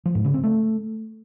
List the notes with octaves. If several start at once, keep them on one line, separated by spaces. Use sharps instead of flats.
F3
G#2
C#3
C4
A3